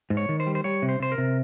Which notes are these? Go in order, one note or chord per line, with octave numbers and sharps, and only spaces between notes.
G#2
C#5
D#3
C5
G3
C5
G3 C#5
C3
C5
C3 C5
A#4
C3